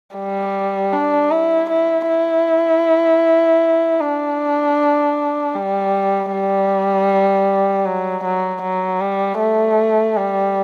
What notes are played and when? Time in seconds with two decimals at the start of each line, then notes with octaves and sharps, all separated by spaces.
0.16 G3
0.93 D4
1.31 E4
1.70 E4
2.08 E4
4.01 D4
5.54 G3
6.32 G3
7.86 F#3
8.24 F#3
8.62 F#3
9.01 G3
9.40 A3
10.17 G3